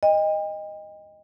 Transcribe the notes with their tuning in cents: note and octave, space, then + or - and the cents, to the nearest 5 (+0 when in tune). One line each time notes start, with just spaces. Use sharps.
D#5 +0 G5 +40